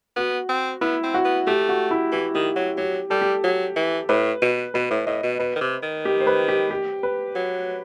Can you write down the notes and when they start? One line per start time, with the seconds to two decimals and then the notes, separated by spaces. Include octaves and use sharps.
0.16 B3 F#4
0.49 C4
0.81 B3 E4
1.03 C4
1.14 F#4
1.25 B3
1.47 A3 G4
1.69 F#4
1.91 E4
2.12 E3 G4
2.35 D#3 G4
2.56 F#3 F#4
2.77 F#3 G4
3.10 G3 A4
3.22 G4
3.44 F#3
3.76 E3
4.09 A2 B4
4.42 B2
4.74 B2 B4
4.91 A2
5.07 A2 D#5
5.23 B2
5.39 B2 B4
5.56 D#3
5.61 C3
5.83 D#3
6.05 G4
6.20 C5
6.27 B4
6.48 G4
6.70 G4
7.03 B4
7.35 F#3